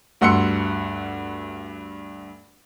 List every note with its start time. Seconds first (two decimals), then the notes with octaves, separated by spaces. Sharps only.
0.21 D2 G2 F#5 C6 E6 C#7